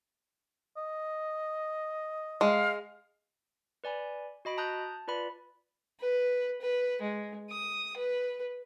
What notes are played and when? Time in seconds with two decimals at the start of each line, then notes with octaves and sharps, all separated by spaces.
0.77 D#5
2.41 G#3 F5
3.84 B4 D5 G#5 B5
4.45 F#4 D#5 B5 D7
4.58 A5 A#5 D#6 F#6 G6
4.81 A5
5.08 F4 B4 D5 B5
6.00 B4
6.61 B4
7.01 G#3
7.50 D#6
7.97 B4